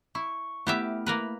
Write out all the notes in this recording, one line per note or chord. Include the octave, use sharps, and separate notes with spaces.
E4 C#6
A3 B3 E4 G4 E5 F6
A#3 A#4 B4